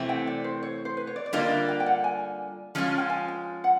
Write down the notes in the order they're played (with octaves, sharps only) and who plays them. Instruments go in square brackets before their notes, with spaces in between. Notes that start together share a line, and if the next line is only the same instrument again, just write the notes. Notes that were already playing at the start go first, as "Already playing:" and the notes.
Already playing: [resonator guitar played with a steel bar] C3 E3 A3 C4
[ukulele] G5
D5
C5
C#5
C5
B4
C#5
D5
D5
[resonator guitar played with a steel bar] D3 G3 A#3 D4 F4 [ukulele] D#5
[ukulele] E5
G5
G5
F#5
G#5
[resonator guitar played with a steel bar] F3 G#3 C#4 F4
[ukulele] G5
G#5
G5
F#5